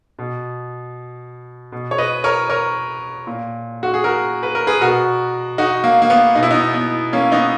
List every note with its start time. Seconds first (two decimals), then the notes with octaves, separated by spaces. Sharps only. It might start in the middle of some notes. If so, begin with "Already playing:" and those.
0.19 B2
1.72 B2
1.91 C#5
1.98 B4 D#5
2.24 A#4 C#5
2.49 A#4 C#5
3.27 A#2
3.83 F#4
3.94 G#4
4.04 F#4 A#4
4.43 B4
4.55 A#4
4.67 G#4 B4
4.81 B2 F#4 A#4
5.58 D#4 F#4
5.84 A#3
6.02 A#3
6.10 B3
6.35 B2 D#4
6.43 E4
6.50 B3 D#4
6.74 B3
7.13 A#3 C#4
7.32 B3 D#4